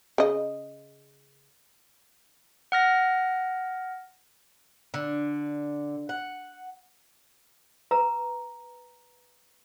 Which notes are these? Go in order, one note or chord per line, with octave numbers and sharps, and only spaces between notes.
C#3 D#5
F#5 F6 A#6
D3
F#5
B4 A#5